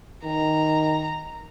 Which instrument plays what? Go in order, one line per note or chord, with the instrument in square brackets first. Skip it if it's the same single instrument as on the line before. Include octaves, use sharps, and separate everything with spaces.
[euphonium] D#3 [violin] A#5